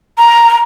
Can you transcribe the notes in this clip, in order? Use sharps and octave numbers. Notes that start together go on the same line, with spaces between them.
A#5